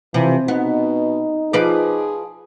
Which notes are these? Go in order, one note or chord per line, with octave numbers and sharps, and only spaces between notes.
C3 E3 F3
B2 B3 D#4
F3 G#4 B4 D5